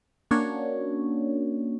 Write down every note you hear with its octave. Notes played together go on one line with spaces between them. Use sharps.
A#3 C#4 D4 F#4 C#5